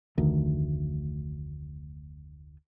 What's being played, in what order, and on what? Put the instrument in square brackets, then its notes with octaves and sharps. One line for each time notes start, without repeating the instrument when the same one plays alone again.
[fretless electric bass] F1 D2 D#3